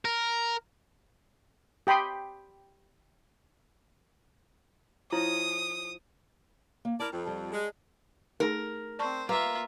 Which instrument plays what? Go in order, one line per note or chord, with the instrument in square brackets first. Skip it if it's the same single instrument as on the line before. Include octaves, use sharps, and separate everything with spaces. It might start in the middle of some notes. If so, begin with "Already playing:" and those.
[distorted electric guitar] A#4
[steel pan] G4 G5 B5 C6 D#6
[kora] F3 C#5 D#5 [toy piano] E4 [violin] D#6
[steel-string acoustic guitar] A#3
[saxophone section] E4 A#4 D5 [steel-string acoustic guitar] A5
[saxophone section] F2
[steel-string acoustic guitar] G3
[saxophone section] G#3
[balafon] A3 D#4 G#4 [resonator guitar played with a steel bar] A#4
[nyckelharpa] C4 C5 [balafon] D5 A5 C#6
[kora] A#3 [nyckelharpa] F4 E5 [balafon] B4